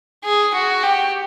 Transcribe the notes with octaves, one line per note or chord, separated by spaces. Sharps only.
G#4
F#4
G4